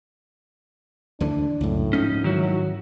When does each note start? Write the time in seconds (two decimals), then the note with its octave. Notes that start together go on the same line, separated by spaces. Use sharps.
1.20 D2 D3 E3 D4
1.60 C#2 F#2 A2
1.93 G#2 F3 C#4 D#4
2.24 D#3 F#3 E4 F#4